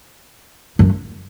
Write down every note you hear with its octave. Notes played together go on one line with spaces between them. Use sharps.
F#2